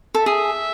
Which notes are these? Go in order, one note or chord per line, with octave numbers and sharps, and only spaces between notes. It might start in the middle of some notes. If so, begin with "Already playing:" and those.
A4
G#4 E5